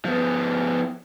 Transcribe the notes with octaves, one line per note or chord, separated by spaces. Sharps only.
F3 B3